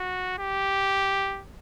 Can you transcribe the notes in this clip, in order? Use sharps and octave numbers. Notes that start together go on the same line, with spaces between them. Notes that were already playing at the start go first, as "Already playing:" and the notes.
Already playing: F#4
G4